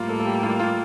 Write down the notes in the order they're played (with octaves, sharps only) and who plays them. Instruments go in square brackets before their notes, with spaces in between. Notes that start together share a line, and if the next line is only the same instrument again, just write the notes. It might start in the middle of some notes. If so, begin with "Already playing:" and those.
Already playing: [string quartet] A2 G3 A#3 [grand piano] F4
[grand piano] A4
A4
G4
F4
F4